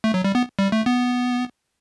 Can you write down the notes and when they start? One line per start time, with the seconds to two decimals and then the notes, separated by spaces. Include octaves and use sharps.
0.04 A3
0.14 F#3
0.24 G3
0.35 B3
0.59 G3
0.72 A3
0.86 B3